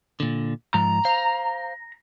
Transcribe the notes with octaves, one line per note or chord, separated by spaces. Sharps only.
A#2 D3
G#2 F3 A#5
C5 F5